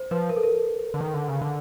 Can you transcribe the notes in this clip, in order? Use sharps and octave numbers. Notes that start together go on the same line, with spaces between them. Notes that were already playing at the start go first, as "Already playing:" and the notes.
Already playing: C5
F3 B4
A#4
A4
A#4
D3
D#3
D3
C#3
D3